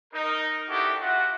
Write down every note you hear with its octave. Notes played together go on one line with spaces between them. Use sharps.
D#4 A#4
C4 D4 E4 F#4 G4 A4
F4 F#4 E5 F#5